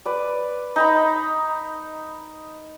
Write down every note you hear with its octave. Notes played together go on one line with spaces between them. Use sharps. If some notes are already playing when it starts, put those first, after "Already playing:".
B4 D5
D#4 A#5 B5